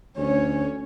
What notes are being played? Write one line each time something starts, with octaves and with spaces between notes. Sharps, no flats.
D2 C#4 C#5